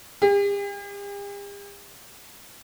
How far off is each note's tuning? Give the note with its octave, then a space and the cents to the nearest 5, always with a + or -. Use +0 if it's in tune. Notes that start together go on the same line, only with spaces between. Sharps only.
G4 +45